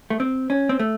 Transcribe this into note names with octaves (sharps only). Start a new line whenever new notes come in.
A3
C4
C#4
C4
A3